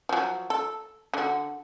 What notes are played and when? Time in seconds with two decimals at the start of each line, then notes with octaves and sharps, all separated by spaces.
0.09 F3 F#3
0.50 A4
1.14 D3 F#4